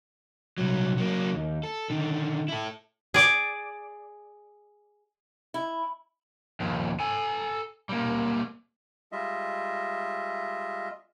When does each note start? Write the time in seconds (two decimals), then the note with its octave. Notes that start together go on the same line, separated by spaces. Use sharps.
0.58 C2 F#3
0.97 F#3 A#3
1.34 D#2
1.63 A4
1.90 D3 D#3
2.48 E4 A4
3.14 G#4 D5
5.54 E4
6.60 D#2 F3
7.00 A4 G#5
7.89 G3 A#3
9.12 G3 G#3 F4 D#5 E5